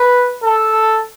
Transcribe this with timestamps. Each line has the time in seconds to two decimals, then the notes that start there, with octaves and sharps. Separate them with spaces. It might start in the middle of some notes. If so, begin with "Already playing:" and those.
Already playing: B4
0.43 A4